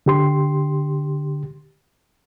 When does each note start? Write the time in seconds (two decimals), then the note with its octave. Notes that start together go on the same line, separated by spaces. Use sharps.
0.06 D3 G4 C6